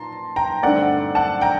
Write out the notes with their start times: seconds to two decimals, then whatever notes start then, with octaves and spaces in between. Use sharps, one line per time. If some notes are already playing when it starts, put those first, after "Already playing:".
Already playing: A#2 A5 A#5 C6
0.36 G5 A#5
0.63 G2 D3 A3 C4 D#4 D5 F#5
1.15 F#5 A5
1.41 G5 A#5